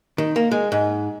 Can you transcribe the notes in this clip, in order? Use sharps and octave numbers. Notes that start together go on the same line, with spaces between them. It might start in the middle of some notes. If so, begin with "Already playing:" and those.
D#3
A#3
G#3
G#2